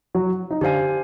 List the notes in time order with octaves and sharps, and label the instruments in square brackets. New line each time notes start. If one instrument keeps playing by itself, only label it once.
[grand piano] F#3 F#4
D#4
[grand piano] D3 D4 [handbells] G4 C5 F5 G#5